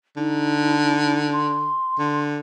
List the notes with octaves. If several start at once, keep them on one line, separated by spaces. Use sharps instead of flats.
D3 D#4
C6
D3